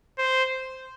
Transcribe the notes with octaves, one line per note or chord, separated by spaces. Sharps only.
C5